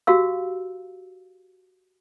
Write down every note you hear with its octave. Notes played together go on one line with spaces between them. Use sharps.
F#4 G4 F5 E6